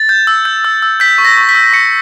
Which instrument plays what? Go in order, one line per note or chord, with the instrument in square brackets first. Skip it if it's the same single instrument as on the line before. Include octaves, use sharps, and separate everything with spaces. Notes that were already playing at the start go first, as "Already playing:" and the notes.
Already playing: [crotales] A6
G6
E6
G6
E6
E6
G6 B6
C#6
A#6
C#6
B6
E6
C#6 C#7